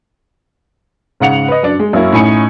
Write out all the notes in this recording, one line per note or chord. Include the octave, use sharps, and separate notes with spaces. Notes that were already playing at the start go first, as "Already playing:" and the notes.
G#2 C#3 F#5 C#7 F7
B4 D#5
F#2 D4
G#3
F#2 A#3 C#4 E4
A2 C#4 D#4 G#5 B5 C#7